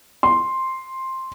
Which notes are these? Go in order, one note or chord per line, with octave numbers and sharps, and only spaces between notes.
C6